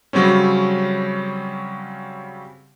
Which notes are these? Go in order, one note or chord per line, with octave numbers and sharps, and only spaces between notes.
C#3 F#3 G3 C4 C#4